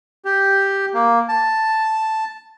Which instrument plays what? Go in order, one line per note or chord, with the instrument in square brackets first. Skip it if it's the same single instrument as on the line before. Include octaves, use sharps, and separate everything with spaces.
[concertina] G4
A#3
A5